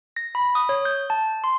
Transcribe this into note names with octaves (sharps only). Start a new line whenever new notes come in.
A#6
B5
D#6
C#5
G6
A5
C6